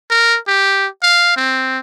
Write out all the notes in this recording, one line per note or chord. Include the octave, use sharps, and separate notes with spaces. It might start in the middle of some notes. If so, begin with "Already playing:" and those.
A#4
G4
F5
C4